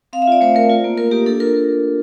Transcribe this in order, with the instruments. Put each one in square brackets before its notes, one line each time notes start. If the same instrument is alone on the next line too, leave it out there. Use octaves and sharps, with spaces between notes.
[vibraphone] C4 F5
E5
F4 D5
A3 C5
A3 A#4
F4
A#3
F4 A#4
A#3 G4
D4 A4
F4 A#4